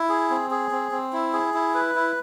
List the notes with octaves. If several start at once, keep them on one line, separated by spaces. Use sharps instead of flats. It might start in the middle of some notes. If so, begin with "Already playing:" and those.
Already playing: E4
G#4
C4
G#4
C4
C4
E4
G#4
E4
B4
E4